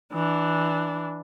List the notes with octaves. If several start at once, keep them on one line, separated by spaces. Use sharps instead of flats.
E3 D4